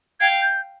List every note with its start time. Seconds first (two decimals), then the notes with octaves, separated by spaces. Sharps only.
0.20 F5 G5 G#6
0.41 G6